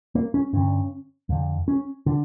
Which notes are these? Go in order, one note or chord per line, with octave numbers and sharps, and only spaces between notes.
A#3
C#4
G2 D3 C#4
F2 D3
C#4
D3 D4